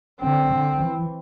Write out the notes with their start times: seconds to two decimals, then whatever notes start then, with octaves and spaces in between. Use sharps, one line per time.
0.21 D3 C4
0.51 D3
0.81 E3